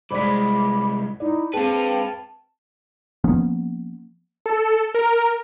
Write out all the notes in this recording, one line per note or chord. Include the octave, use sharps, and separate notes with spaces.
C2 G#3 C5 D5 B5 D6 B6
D#4 E4 D5
C4 G#4 B4 F5 G5 A5
F3 A#3 B3 C#4
A4
A#4